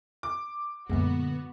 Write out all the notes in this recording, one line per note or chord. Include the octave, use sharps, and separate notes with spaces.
D6
F#2 A#2 D3 G#3 B3 F#4